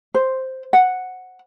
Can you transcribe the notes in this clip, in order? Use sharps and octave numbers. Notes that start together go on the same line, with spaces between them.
C5
F#5